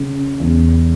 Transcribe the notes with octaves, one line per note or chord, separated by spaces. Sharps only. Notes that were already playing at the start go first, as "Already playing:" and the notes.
Already playing: C#3
E2